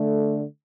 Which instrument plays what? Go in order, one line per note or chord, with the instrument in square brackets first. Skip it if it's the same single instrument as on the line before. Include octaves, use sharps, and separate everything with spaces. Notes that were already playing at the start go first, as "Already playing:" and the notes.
Already playing: [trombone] D3 [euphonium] A3